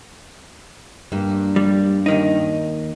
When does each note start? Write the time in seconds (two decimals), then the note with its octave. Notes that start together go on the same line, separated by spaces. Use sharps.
1.12 G2 A#3
1.56 G3
2.06 D#2 D#3 D#4